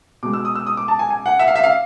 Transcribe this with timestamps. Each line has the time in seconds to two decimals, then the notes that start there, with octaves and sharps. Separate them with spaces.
0.23 B2 G#3 D6
0.33 E6
0.45 D#6
0.55 E6
0.67 D#6
0.77 D6
0.88 A5
0.99 G#5
1.10 G#5
1.26 F#5
1.39 E5
1.48 F5
1.56 E5
1.63 F5